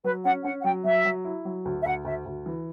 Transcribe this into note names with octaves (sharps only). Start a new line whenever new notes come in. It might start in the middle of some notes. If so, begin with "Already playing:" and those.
F#3 B4
C#4 F#5
C#4 F#5
F#5
F#3 G5
F#3 E5
F#3
E4
F#3
D2
E5
D2 F#5
D2 E5
D2
E3